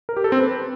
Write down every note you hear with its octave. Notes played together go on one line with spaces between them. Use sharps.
A#4
G4
A4
C4
B4